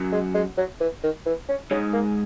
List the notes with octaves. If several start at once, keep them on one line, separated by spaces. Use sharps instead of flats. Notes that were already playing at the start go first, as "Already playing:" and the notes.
Already playing: F#2 F#3
G#3
G#3
F#3
E3
D#3
E3
C#4
G#2 G#3 C#4
A#3